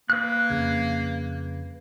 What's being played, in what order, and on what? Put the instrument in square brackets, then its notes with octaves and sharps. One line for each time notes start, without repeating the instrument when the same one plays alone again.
[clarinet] A#3 [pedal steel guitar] B4 F#6
[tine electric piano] F2 C#3 G#6